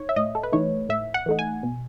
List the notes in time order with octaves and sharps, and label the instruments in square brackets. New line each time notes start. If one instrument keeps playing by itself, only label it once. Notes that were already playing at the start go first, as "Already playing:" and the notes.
Already playing: [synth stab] D#4 C#5
E5
A2 D#5
A4
B4
E3 A3 D#4 C#5
A2 E5
F#5
E3 A3 D#4
G#5
B2